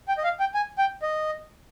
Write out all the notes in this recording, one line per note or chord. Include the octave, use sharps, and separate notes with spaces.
G5
D#5
F5
G5
G#5
G5
D#5